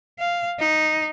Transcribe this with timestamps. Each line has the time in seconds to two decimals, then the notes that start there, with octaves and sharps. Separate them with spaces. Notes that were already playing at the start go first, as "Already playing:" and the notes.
0.19 F5
0.59 D#4